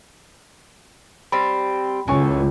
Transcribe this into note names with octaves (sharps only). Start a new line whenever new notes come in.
G3 C4 B5
C#2 E3 C#4 A4 G#5 C#6